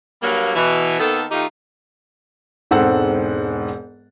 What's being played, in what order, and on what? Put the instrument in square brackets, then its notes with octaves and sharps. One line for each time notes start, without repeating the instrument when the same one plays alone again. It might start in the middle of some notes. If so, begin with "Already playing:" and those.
[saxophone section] G2 F#3 G3 A#3
B2 E3
D#3 A#3 B3 A4
D#3 A3 D#4 F4 G4
[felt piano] E1 G#2 C4 A4 F#5 E6